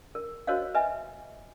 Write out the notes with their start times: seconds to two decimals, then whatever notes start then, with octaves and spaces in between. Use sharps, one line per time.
0.15 A#4
0.47 F#4 A#4 C5 C#5 D#5 F5
0.74 B4 D#5 E5 G#5